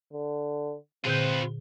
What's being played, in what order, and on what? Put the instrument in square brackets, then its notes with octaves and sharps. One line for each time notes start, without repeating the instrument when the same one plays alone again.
[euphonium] D3
[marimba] A#2 D3 G6 [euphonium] C4 [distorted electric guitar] F4 B4